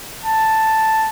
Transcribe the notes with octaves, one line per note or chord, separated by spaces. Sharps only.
A5